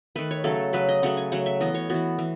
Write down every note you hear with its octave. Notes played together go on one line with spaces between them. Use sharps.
D#3 A3 B4
C#5
C#3 F#3 A3 A4
C#3 F#3 A3 B4
D#5
C#3 F#3 A3 F#5
G#5
C#3 F#3 A3 F#5
E5
E3 B3 D#5
C#5
E3 B3 F#4
E3